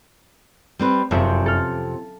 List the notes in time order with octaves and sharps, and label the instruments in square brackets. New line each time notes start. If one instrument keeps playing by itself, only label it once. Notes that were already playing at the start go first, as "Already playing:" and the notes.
[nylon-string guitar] G3 C4 B4
[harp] F#1 E5 E6 [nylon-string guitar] F2 C3 C4
[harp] A4 F6